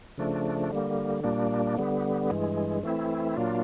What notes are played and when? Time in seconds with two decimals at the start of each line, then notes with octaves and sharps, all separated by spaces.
0.18 C#3 F3 A3 D4
0.71 D3 G3 A#3
1.24 A#2 G3 A#3 D4
1.78 D3 G3 B3
2.30 G2 E3 G#3
2.83 E3 A3 C4 E4
3.37 A#2 F#3 A#3 D4 F4